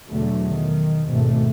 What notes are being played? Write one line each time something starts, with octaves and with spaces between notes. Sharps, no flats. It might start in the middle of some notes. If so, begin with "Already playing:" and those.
E2 B2 D3 F#3 A3
D#3
G#1 D2 B2 A3